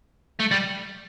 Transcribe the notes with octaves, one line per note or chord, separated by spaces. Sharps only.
A3
G3